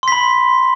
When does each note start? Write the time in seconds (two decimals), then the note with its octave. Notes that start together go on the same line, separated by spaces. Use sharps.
0.03 C6
0.08 B6
0.12 B5